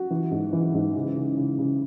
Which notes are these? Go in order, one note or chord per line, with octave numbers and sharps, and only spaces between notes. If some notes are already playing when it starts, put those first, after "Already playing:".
Already playing: F#4
E3
G#2
E3
G#2
C#3
C#3
C#3
C#3